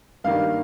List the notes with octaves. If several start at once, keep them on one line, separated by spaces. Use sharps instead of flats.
G2 D#3 G3 A#3 F5